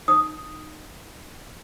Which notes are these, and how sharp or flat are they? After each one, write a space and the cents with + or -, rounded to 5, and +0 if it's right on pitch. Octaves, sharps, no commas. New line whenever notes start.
D#4 -20 D#6 +0